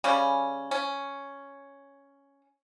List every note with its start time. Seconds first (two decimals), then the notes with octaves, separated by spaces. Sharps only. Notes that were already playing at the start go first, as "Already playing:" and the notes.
0.04 C#3 G3 C#4
0.71 C#4